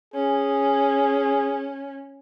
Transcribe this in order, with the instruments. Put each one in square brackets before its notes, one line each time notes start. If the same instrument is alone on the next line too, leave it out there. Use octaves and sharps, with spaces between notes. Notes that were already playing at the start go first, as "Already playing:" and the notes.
[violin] C#4 [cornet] G#4